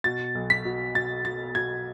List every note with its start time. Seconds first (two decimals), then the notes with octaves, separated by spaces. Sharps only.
0.04 B2 A6
0.35 B1
0.50 B6
0.65 B2
0.94 B2 A6
1.25 B2 A6
1.55 B2 G#6